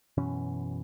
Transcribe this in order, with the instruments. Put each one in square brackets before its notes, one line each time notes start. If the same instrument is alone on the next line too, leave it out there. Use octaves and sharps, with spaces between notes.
[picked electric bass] F#2 B2 E3 C#4